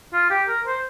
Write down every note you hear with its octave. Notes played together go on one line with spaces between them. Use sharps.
F4
G4
A#4
C5